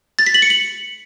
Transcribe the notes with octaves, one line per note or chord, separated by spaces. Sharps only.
A6
B6
F#7
C#7
F#7